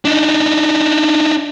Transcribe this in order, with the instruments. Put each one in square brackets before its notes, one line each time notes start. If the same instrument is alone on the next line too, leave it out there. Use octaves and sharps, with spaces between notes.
[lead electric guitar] D4 D#4